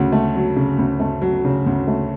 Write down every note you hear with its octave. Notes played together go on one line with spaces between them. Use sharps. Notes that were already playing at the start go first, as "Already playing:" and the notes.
Already playing: D2 C#3
A3
F#3
C#3
D2
A3
F#3
C#3
D2
A3